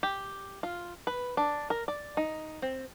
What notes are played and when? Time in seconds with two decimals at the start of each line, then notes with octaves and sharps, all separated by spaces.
0.03 G4
0.63 F4
1.07 B4
1.37 D4
1.70 A#4
1.88 D5
2.17 D#4
2.62 C4